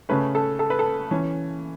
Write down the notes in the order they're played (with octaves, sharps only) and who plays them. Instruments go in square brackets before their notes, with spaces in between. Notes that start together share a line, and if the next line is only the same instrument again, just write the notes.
[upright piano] C#3 A3 C#4 B4
A4
A4
B4
A4
E3 C#4